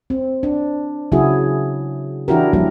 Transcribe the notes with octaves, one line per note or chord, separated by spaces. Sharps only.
C4
D4
C#3 F#3 E4 F#4 G#4
E3 D4 E4 F#4 G4 A#4
F3 G3 A#3 E4 A#4